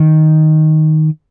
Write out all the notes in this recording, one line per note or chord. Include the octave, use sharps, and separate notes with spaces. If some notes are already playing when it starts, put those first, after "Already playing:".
Already playing: D#3